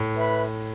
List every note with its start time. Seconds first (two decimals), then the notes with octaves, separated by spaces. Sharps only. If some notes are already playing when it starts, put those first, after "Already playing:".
Already playing: A2
0.15 B4 E5 B5